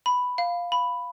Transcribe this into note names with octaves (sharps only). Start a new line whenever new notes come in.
B5
F5
B5